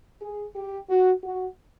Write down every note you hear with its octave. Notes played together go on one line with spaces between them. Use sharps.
G#4
G4
F#4
F#4